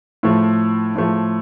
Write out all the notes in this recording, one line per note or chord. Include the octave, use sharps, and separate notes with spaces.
A2 F3 A3
A2 F3 A3